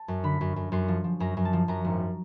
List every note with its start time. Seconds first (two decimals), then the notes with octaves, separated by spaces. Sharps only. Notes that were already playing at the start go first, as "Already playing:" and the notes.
Already playing: A5
0.08 F#2
0.23 D3 B5
0.41 F#2
0.56 F#2
0.72 F#2 C6
0.88 F3
1.04 F3
1.20 F#2 A#5
1.37 F#2
1.45 A5
1.53 F3
1.68 F#2 A#5
1.85 G#1